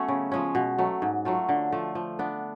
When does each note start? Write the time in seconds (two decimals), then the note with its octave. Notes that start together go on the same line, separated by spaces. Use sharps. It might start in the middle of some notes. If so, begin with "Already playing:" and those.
Already playing: F#3 A3 B3 C#4
0.08 C#3
0.32 F3 G#3 C#4
0.55 B2
0.78 F#3 A3
1.02 G#2
1.25 F#3 A3 F4
1.49 D3
1.72 F3 A3
1.95 F3
2.19 B3 D4